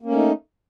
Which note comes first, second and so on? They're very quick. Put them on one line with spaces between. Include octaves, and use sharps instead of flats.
A#3 C#4 A3 D#4